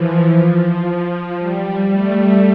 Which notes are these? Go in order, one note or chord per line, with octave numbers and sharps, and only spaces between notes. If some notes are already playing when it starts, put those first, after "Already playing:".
Already playing: E3 F3
F3
F3
G3
A3